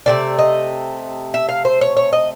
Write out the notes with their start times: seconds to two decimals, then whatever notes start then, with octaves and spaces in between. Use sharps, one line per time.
0.06 C3 E3 A3 D5
0.39 D#5
1.34 E5
1.49 F5
1.65 C5
1.81 C#5
1.97 C#5
2.13 D#5